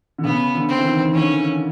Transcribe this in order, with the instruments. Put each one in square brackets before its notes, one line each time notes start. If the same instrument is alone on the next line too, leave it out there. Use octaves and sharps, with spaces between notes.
[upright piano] D3
[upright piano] C#3 [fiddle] B3
[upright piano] D3
[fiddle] C4
[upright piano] E3
D#3
D#3
[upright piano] D3 [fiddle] C#4